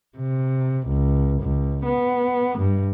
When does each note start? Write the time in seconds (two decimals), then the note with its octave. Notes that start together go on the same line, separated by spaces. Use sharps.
0.18 C3
0.88 C#2
1.42 C#2
1.86 B3
2.59 G2